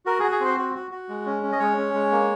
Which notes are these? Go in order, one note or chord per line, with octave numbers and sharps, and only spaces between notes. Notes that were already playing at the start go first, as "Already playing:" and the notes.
F#4 A#4
G#4
F#4
G#4
C4 C5
F#4
F#4
F#4
G#3
C#4
C#4
D#5
G#3 C#5
C#4
G#3
A#3